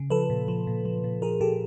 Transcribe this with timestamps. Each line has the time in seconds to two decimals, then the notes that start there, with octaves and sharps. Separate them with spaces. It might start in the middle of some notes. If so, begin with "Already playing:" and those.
Already playing: C#3
0.10 F3 A4 B4
0.30 A#2
0.48 F3
0.67 A#2
0.85 F3
1.04 A#2
1.22 F3 G#4 A#4
1.40 A#2 G4 A4